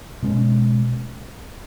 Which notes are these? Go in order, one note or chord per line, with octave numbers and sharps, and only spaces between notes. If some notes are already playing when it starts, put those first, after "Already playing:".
B2 G#3 C#4